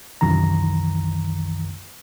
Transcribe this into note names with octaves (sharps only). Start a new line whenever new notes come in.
C2 F#2 D#3 E3 A#5